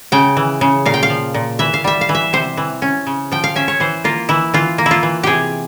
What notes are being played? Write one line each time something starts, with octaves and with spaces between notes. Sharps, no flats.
C#3 G5
E3
C#3
A#2 F5
G5
F5
F3
A#2
E3 E5
F5
G3 E5
F5
E3
E5
C3 C5
E3
C#4
C#3
F3 G5
F5
C#4 E5
C#5
E3 C5
A#3 F4
E3 E4
E3 F4
A#3
E4
F4
E3
C3 G4 G#4